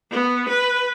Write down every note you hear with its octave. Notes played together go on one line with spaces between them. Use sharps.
B3
B4